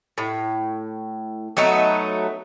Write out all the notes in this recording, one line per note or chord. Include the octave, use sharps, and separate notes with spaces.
A2
F#3 A3 B3 D#4